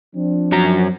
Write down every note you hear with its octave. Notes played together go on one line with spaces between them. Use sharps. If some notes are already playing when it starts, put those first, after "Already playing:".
F3 C4 D4
F#2 F#3 A#5